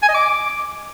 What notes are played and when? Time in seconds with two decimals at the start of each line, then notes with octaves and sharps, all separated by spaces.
0.02 G#5
0.08 D#5
0.14 D6